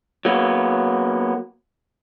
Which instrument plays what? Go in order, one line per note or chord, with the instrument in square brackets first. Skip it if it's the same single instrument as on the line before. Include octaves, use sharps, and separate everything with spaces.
[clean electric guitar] F#3 A#3 B3